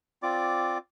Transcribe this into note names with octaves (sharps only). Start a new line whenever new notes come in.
C4 F4 D5 D6